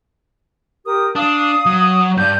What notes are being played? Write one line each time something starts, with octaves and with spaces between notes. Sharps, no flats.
G4 A#4 D#6
D4 F5 D#6
F#3
G2 D5 G6